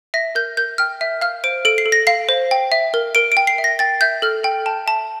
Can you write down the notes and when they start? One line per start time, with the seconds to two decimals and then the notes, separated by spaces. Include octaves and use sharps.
0.14 E5 A#6
0.35 A#4 G6
0.57 A#4 G6
0.78 G5 F6
1.01 E5
1.21 F5 F6
1.44 C5 D7
1.65 A4 D7
1.78 C7
1.86 A4
1.92 A#6
2.07 F5 C7
2.29 C5
2.51 G5
2.72 E5
2.94 A#4
3.15 A#4 D7
3.32 D7
3.37 G5
3.47 C7
3.58 E5
3.64 A#6
3.79 G5 A6
4.01 E5 G6
4.22 A4 F6
4.44 A4 G5
4.66 G5 A5
4.86 E5 A5